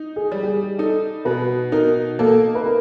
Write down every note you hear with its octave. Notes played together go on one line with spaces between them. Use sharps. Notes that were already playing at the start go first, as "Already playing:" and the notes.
Already playing: D#4
G#4
G3
G4
G#4
D#4 A4
B2 B4
D#4 A#4
A#3 A4
B4
A#4